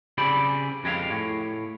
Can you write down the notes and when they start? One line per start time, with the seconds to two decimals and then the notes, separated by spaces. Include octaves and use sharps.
0.18 C#3 C4 G4 G#4 D5 B5
0.84 F2 G#3 G4 A4 F5
1.10 A2